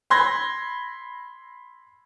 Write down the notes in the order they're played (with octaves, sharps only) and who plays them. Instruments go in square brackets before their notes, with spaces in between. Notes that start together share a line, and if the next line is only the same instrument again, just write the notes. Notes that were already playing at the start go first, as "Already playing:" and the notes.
[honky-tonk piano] B5 C6 G#6 A#6